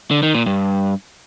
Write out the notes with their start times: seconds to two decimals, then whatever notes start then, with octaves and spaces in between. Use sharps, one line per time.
0.11 D3
0.23 D#3
0.35 A#2
0.46 G2